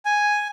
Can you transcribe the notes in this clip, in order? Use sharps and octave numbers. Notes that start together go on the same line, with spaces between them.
G#5